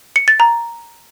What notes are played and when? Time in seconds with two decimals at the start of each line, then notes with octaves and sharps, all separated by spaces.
0.16 C#7
0.28 A6
0.40 A#5